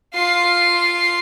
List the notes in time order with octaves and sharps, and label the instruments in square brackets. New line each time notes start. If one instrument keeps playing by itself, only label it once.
[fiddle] F4 C6